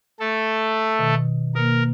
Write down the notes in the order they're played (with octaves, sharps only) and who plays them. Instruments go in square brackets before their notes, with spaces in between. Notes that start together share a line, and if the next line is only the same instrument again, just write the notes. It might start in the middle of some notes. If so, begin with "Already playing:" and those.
[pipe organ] A3 A4
[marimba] B2 D#3
[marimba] B2 A#3 [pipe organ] A#4